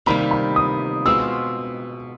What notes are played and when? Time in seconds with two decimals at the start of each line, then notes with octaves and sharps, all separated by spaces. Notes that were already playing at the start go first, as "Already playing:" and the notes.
0.06 C3 D#3 G3 A#3 B5
0.31 B5
0.56 D#6
1.06 B2 G#3 C4 F4 E6